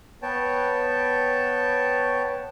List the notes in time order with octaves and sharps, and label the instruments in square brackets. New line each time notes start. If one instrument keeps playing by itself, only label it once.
[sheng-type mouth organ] B3 C#5 G5 A5